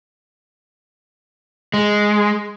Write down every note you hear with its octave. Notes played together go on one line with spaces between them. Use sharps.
G#3